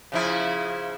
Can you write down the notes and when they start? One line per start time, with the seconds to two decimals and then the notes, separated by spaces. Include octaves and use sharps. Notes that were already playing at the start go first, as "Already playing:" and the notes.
0.12 C#3 F3 E4